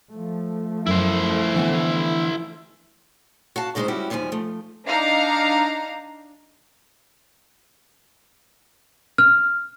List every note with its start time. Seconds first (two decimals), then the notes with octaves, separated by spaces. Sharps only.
0.11 F3 A3
0.86 F#2 E4 C5
1.54 D3 E3 B3
3.56 F#4 F5 A5
3.75 G2 C#3 G#3 D#4 F4 C5
3.88 G3 C#4 E4 F#4 G4
4.10 D#2 B2 F3 G3 G#5
4.32 F3 A3
4.86 D4 D#4 F5 A#5
9.18 F6